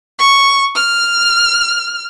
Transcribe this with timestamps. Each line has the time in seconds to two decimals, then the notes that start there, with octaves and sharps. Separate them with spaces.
0.18 C#6
0.74 F6